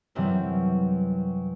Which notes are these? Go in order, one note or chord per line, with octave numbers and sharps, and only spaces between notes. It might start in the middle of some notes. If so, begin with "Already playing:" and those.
F#2 C3 E3 F#3 G3 C4